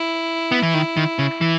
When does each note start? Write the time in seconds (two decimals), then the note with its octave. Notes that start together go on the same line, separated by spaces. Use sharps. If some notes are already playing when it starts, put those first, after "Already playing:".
Already playing: E4
0.52 B3
0.63 E3
0.74 D#3
0.97 D#3
1.19 C#3
1.41 E3